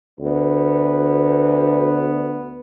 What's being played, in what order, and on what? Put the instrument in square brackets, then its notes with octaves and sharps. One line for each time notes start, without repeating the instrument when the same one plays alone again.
[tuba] D2 [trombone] B3